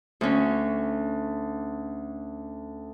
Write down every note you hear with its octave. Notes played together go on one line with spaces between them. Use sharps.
D2 C#4